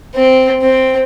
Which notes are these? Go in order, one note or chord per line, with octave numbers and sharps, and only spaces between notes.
C4
C4